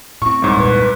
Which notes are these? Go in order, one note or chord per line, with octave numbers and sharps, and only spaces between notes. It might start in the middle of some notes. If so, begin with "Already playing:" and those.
A2 C4 C#6
C2 G#2 C#5
E2 A#2 B4